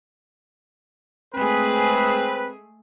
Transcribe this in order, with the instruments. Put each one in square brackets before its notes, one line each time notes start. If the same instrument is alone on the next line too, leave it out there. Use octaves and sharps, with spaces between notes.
[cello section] G#3 A3 G#4 [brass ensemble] C4 B4